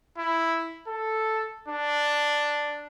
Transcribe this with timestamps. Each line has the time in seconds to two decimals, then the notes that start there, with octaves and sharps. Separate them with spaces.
0.18 E4
0.88 A4
1.68 D4